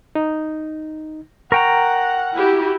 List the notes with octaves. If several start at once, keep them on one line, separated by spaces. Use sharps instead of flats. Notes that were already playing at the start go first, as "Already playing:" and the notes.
D#4
A#4 F#5 G5 A#5 C#6
E4 F#4 G4